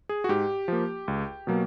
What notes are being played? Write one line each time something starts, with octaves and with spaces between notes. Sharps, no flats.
G#4
F#4
G#2 G4
F3 A#3
C#2
B2 F#3 A#3